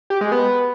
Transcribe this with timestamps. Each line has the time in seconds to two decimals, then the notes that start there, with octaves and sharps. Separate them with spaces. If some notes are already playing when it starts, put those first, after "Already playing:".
0.10 G4
0.21 G#3
0.32 B3